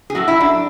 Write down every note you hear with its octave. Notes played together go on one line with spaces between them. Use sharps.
G#4
A2 F#3 A3 F#4
E4
D4